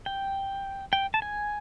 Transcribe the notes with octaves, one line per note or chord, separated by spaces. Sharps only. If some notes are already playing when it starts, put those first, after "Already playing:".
G5
G5
A5
G#5